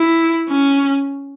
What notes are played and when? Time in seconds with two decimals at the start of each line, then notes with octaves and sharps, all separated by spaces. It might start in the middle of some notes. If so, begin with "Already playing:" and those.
Already playing: E4
0.49 C#4